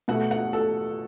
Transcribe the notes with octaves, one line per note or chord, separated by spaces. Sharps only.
B2 A3 F#5
F#5
A4